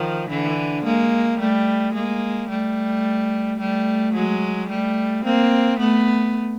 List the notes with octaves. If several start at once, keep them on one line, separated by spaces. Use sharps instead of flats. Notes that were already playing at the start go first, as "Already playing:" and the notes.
Already playing: D#3 F3
D3 E3
G#3 A#3
G3 A3
G#3 A#3
G3 A3
G3 A3
F#3 G#3
G3 A3
A#3 C4
A3 B3